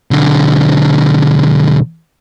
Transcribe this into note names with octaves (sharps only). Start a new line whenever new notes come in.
B1 D3